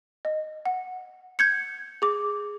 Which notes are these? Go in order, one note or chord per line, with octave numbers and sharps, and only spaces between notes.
D#5
F#5
G6 G#6 C#7
G#4 D6